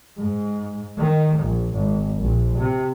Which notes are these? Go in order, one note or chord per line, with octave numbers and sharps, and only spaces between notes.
G#2
D#3
A#1
G#1
A#1
C3